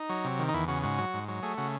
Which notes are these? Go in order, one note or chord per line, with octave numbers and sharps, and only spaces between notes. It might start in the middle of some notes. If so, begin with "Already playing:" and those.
Already playing: D#4
F#3
C3
D#3
D#4
E2 E4
C#3 F#4
G#2 F#4
F#3
G#2
F#3
A3 G#4
C#3 F#4